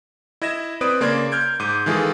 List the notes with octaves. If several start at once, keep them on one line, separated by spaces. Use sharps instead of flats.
E4 D#5 G#6 A#6 E7
C4 B4 D5 D#6 D7
C#3 A#3 D5 C6 G#6
F6 G6 G#6 D7
G#2 D6 G6 D#7
D#3 E3 G#3 F4 G#4 A4